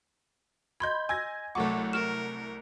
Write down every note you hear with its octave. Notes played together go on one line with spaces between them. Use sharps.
D#5 B5 C6 G6 G#6
G#5 E6 G#6 A#6
C2 F#3 A3 A4 F#5 C#6 D6
A#4 F6 E7